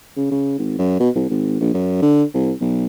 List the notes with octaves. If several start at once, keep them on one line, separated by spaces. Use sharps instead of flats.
C#3
C#3
G#1
F#2
B2
C2
G#1
A#1
F#2
D3
C2
B1